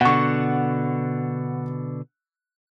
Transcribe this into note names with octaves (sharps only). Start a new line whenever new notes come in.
B2 D3 F#5 C#6